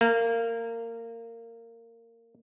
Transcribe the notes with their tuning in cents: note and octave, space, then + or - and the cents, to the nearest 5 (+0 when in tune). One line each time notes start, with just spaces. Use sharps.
A#3 -20